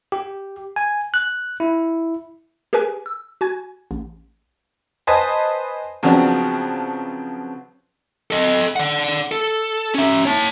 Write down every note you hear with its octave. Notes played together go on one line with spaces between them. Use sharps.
G4
G#5
F#6
E4
G4 G#4 A#4 B4 G#5
E6
F#4 G#5 G#6
A1
B4 C5 D#5 G#5 A5
C#3 F3 F#3 B3 C4 D4
A4 D#5
D5 F#5
A4
C#4 E5
C#5 A5